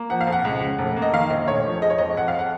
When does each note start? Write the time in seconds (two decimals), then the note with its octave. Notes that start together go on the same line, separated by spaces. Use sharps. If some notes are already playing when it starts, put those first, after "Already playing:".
Already playing: A#3
0.10 F3 F#5
0.21 F5
0.27 F2
0.32 F#5
0.45 C#2
0.61 C#3
0.79 F1
0.97 A#3
1.02 D#5
1.13 D#3 F5
1.30 A#1 D#5
1.47 F1 C#5
1.65 F3
1.82 G#3 D#5
1.90 C#5
1.98 F2 D#5
2.17 F2 F#5
2.28 F5
2.39 F#5